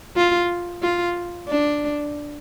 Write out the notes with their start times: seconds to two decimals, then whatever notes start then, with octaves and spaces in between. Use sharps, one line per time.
0.17 F4
0.82 F4
1.48 D4